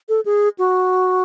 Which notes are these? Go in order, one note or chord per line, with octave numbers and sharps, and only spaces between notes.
A4
G#4
F#4